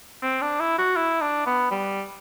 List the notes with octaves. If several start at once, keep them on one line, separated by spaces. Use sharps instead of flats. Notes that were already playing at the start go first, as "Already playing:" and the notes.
C4
D4
E4
F#4
E4
D4
B3
G3